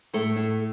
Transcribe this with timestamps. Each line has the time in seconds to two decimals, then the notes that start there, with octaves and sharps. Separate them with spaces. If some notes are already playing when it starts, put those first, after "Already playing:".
0.14 A2 A3
0.36 A2